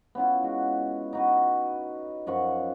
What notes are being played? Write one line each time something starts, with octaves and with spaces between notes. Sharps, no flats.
B3 C#4 E4 F4
G#3 F#4
D#4 F#4 B4
F#2 F3 F#5 C#6